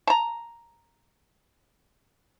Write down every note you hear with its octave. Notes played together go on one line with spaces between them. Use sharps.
A5 A#5